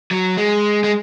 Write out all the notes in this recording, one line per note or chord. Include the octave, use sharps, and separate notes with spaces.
F#3
G#3
G#3